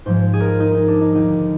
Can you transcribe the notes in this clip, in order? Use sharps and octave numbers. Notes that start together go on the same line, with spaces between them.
G#2 F3 G#3 C5
G#4
A#4
G#4
D#4
D#4
D4
D#4
D#2 D3 G#3 D#4